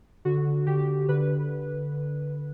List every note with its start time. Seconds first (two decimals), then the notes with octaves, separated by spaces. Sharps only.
0.25 D3 F#4
0.67 D3 G4
1.09 D3 B4